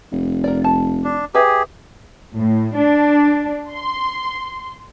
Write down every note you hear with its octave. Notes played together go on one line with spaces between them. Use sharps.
F1
A#4 D5
A5
D4
G4 G#4 B4 E5
A2
D4
C6